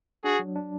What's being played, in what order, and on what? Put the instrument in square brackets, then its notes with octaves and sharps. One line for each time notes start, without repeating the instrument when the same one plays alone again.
[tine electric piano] D4 [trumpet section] F#4 G#4
[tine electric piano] F#3
D4